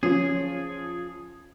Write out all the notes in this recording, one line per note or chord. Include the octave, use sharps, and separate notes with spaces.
F3 C#4 G#4